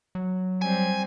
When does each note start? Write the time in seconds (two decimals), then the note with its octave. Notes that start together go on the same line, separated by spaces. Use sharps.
0.15 F#3
0.62 G3 C4 G#5